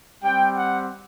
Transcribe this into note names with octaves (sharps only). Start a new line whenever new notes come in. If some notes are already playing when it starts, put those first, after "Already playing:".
G3 C4 G4 G5
F#5